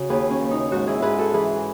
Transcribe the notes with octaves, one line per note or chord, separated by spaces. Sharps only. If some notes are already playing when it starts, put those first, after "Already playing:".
Already playing: C#3 F#4
D#2 G#4 B4
C#4
D#2
D#4
G#2 D#4 F#4
E4 G#4
G#2 G#4 B4
F#4 A4
E3 G#4 B4